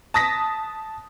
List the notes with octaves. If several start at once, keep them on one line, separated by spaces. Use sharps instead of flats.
A5 D#6 A#6 B6